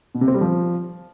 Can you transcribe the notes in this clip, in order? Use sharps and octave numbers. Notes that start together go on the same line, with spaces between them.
B2
C3
C4
G3
F3